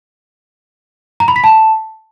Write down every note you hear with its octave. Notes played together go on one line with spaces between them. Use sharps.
A#5
B5
B6
A5